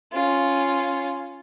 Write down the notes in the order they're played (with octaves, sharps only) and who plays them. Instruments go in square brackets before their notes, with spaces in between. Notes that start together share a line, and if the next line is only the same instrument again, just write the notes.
[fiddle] C#4 F4